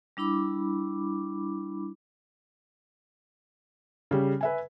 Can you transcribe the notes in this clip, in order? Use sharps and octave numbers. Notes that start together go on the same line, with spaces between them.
G3 D4 E4 B5 D6
C#3 G3
B4 E5 G#5